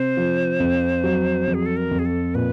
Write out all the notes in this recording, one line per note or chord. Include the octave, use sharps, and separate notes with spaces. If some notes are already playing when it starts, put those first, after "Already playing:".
Already playing: C3 C5
F3
F2
F#3
F2
G#4
A4
A#4
F2
G#4
A4
A#2 B4